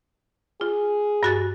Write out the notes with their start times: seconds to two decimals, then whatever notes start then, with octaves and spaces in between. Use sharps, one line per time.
0.61 F4 G#4
1.23 G2 F#4 A6